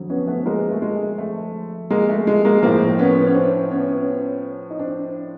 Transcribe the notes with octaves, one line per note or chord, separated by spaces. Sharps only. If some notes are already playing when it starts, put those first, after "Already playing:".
Already playing: F2 D3 F#3
B3 C#4
A3 B3
G#3 A#3
A3
G#3
A3
G#3 A#3
A3
G#3
G#3 A#3
A2 F3 A#3 C4
B3 C#4
C#4
C4 D4
B3 C#4
D#4
C4 D4